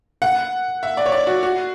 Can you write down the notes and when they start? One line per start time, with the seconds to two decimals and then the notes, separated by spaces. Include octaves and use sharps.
0.22 F#5
0.83 E5
0.97 D5
1.06 C#5
1.12 D5
1.27 F#4
1.43 F#4